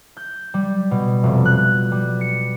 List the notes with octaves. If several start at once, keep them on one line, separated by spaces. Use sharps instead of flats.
G6
G3
B2
F1
F#6
G3
C#7